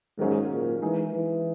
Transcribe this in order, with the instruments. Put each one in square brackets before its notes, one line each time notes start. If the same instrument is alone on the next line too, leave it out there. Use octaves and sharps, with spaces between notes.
[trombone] G#2 [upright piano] D#3 F#3 A#3 C#4 G#4
[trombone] A#2
[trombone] E3 [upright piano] G#3 D#4 G#4
[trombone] E3